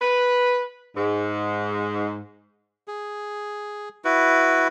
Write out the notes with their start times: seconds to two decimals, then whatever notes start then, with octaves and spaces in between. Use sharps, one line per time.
0.01 B4
0.96 G#2
2.88 G#4
4.05 E4 F#4 B4